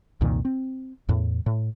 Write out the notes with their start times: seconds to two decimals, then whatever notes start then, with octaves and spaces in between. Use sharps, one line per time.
0.21 C2 F2 A#2 D#3
0.45 C4
1.09 E2 A2
1.46 A2